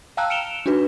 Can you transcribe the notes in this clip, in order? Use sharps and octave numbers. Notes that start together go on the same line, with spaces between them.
F5 G5 A5 A#5 E6 F#6
F6 C#7 D7 E7 F7 G7
D4 D#4 F#4 B4